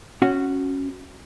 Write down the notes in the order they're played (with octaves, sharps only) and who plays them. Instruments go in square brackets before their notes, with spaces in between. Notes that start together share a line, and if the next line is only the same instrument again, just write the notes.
[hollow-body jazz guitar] C#4 F#4 F#5